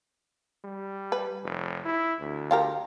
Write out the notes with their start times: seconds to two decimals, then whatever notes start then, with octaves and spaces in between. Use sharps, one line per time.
0.65 G3
1.12 B4
1.43 F1
1.85 E4
2.20 D2
2.51 F4 G4 A#4